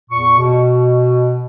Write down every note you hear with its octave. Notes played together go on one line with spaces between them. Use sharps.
E2 A#2 C#6
B2